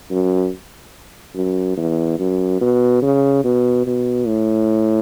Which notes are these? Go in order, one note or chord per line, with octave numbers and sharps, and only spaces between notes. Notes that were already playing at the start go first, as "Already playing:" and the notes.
F#2
F#2
E2
F#2
B2
C#3
B2
B2
A2